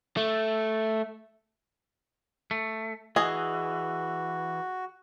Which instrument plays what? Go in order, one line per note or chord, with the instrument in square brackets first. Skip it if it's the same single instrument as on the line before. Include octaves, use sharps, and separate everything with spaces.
[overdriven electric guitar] A3
[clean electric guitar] A3
[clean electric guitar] E3 [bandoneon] F#4 [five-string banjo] G#4 D#5